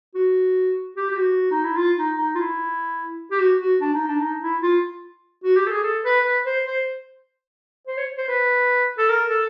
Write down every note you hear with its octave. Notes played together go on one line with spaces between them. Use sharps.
F#4
G4
G4
F#4
D#4
E4
F4
D#4
D#4
F4
E4
G4
F#4
F#4
D4
D#4
D4
D#4
E4
F4
F#4
G4
A4
G#4
A4
B4
B4
C5
C5
C5
C#5
C5
B4
A4
A#4
A4